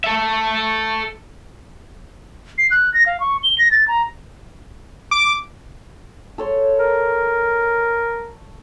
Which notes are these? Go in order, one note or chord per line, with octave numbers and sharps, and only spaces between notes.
A4 E5
C7
F#6
A#6
F5
C#6
G7
A#6
A6
A#5
D6
A4 C#5 C6
A#4